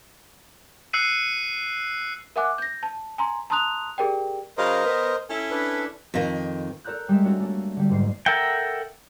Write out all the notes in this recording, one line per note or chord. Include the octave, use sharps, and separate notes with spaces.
E6 F#6 C7 C#7 D#7
A#4 E5 F#5 G#5 D6 F#6
G6 A#6
A5
G#5 A#5 C6
A5 A#5 C6 D#6 F#6 F7
G4 G#4 A#4 D5 G5
C#3 F#3 A#4 C5 D#5 F5
B3
C#4 E4 A4
D4 B4
F2 D#3
A4 A#4 D5 A#5 F#6 G6
G3 G#3 E5
C#4 D4 F#4 A4 A5 A#5
A3 A#3 D4
D3 G3
F#1 G#2 C7
A4 A#4 E5 F#5 G5